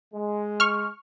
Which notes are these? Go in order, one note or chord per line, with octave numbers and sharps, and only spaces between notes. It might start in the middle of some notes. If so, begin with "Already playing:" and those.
G#3
C#6 F6